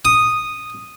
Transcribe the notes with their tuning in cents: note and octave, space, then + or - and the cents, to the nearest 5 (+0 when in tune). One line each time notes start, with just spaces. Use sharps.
D#6 -5